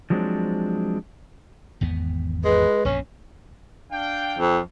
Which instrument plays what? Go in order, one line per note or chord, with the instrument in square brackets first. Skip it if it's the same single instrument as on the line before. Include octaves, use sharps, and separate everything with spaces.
[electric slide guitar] F3 F#3 G#3 C4 D4
[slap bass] G#1 E2 B3
[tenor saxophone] G#3 [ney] B4
[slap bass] A#1 F#2 B2 [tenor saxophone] C#4
[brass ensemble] D4 F5 G5
[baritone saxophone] F2